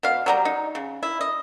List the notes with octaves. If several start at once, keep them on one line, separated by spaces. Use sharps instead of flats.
B2 F5
F#3 G3 A#5
D#4
C#3
E4
D#5